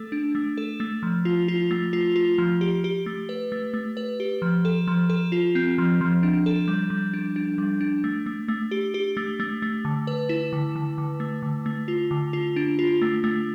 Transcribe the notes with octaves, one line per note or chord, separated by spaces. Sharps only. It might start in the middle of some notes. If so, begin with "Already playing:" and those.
Already playing: A3 A4
D4
A3
A4
A3
F3
F4
F4
A3
F4
F4
F3
G4
G4
A3
B4
A3
A3
B4
G4
F3
A4
F3
A4
F4
C4
F3
F3
D4
A4
G3
G3
D4
D4
G3
D4
A3
A3
A3
G4
G4
A3
A3
A3
D3
B4
E4
D3
D3
D3
A3
D3
A3
F4
D3
F4
D4
F4
A3
A3